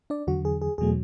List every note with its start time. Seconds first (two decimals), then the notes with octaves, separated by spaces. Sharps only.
0.10 D4 D5
0.27 E2 D3 F#3 F#4
0.45 G#4
0.62 G#4
0.78 E2 B2 F#3 A3 G#4